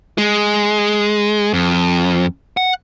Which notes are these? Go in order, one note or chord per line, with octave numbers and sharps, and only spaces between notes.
G#3
F2
F#5